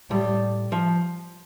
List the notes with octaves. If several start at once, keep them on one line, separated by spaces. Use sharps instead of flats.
A2 G3
F3